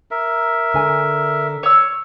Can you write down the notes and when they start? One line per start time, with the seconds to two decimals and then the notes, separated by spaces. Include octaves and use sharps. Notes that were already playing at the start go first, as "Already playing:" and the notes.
0.11 A#4 E5
0.74 D3 G#5
1.63 C#5 E6